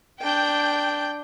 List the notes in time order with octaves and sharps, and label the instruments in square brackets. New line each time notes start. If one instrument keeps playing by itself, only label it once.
[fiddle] D4 [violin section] G5 G6